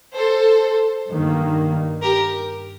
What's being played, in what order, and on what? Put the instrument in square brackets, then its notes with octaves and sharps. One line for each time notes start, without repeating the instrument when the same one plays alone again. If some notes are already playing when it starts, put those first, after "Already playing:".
[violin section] A4 C5
[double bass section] G2 D#3 A#3
[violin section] G4 A#4